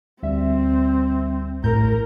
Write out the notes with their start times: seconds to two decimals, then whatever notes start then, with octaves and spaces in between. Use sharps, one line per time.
0.23 D2 G3 C4 E5
1.64 A#1 A2 A#4 G6